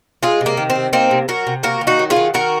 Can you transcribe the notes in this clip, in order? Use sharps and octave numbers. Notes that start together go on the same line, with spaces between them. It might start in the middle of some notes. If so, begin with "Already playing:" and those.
G#3 F4 G#4
C3
A#3
D#3
C4
C3
A#3 C4 D#4
C3
F#3 F#4 A#4
C3
A#3 F#4 A#4
D#3
D#4 F#4
F#3
F4 G#4
D#3
D#3 F#4 A#4